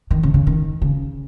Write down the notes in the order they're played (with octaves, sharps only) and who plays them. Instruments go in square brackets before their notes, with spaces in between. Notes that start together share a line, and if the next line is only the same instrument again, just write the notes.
[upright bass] D#3
C#3
C#3
D#3
C#3